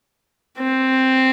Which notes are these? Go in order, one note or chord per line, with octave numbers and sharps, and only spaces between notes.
C4